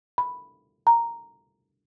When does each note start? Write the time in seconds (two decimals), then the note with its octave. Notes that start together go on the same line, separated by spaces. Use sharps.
0.18 B5
0.87 A#5